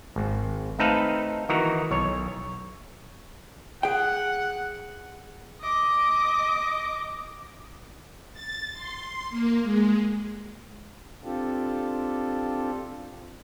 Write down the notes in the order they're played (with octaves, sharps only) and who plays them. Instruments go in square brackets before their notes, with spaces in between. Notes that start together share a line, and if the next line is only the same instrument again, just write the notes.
[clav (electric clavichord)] G#1
A3 C4 D#4 A4 B4 F5
D#3 E3 F#4 A#5
B1 C#5
[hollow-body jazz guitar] G#4 G5 [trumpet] F#5
[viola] D#5 D6
[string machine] A6
C6
A#3
G#3
[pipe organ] C4 D4 F4 G4 A4